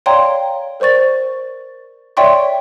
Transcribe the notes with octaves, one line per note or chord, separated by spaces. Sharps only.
C#5 D5 F5 G5 A#5 C6
A#4 C5 D5 C#6 A6
C#5 D5 E5 G5 C6 C#6